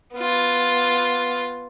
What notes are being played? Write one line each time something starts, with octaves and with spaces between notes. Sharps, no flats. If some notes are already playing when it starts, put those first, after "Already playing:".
B3 F4